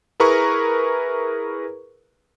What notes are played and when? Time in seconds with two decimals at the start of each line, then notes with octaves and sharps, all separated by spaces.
0.20 E4 G#4 A#4 B4 A#5 C#6